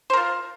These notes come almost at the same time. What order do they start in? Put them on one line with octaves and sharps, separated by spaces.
C5 A#4 F4